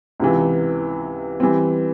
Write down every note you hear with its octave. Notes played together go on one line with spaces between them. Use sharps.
C#2 C3 E3
E3 G3 C4